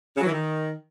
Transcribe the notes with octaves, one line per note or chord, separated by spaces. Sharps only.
C#3
F#3
E3
D#3